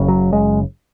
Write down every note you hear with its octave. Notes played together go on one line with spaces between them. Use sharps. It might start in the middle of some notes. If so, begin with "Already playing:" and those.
Already playing: F#1 F#2 C#3
F#3
G#3